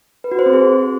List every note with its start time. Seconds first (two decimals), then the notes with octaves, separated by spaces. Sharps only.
0.24 B4
0.31 F#4
0.39 C5
0.46 C4
0.53 G#4